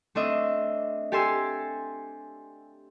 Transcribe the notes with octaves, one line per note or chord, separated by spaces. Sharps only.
A3 C4 D4 D#5 E5
G4 A4 G#5 A5 C6 E6